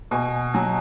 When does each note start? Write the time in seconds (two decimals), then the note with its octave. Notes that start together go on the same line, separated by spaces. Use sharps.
0.11 B2 G#5
0.54 F#3 G#5